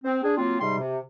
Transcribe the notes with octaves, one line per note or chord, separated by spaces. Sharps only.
C4
D4 G#4
F#3 A#3 C4 F4
G#2 C3 G3 C6
C3